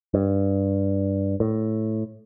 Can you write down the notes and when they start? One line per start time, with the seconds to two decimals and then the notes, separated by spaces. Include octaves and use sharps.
0.14 G2
1.40 A2